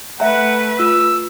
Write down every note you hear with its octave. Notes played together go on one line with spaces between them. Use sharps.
A3 B4 E5 F#5 A#5
F4 E6